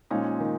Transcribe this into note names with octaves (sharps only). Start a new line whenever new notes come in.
A#2 F3 G#3 C#4 D#4
D#3